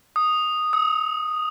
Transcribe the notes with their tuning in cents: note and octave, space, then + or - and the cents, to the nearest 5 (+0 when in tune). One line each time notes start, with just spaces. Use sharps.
D#6 -5
D#6 +45